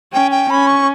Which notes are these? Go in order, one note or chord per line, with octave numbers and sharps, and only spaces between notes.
C#4 G5
G5
C#4 B5
C#6